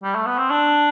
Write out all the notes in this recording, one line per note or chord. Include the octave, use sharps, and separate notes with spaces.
G3
A3
B3
C4
D4